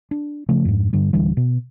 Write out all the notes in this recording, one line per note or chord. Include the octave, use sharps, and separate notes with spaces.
D4
C#3 F3 A3
F2 G#2
G2 D3 G3
D1 D3 E3 G3
B2